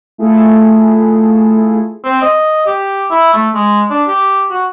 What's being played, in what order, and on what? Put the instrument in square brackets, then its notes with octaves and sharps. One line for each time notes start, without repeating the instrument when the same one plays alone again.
[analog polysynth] A3 E4 F4 G#4 A4
[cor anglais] C4
D#5
G4
E4
A3
G#3
D4
G4
F#4